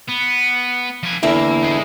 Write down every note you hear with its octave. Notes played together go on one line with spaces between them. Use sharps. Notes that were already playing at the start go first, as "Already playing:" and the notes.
B3
F3 G#5
E2 D3 A#3 E4
D#4 G#4